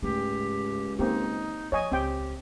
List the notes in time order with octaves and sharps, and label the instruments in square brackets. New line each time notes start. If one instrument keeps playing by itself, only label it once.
[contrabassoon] C#2 [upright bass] G#2 A3 [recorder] G4
[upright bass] D#3 [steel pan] A#3 C4 G4 [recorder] D#4
[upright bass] F3 [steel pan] C#5 D#5 G#5
[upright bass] C#2 [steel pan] C4 G5 [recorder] G4